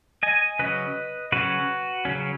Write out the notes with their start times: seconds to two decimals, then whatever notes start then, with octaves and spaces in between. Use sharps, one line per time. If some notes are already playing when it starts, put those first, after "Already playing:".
0.23 D#5 G#5
0.59 C#3 F#3 C#4 B4 D#5
1.32 C#3 F#3 C#4 F#4 B4
2.05 C#3 F#3 C#4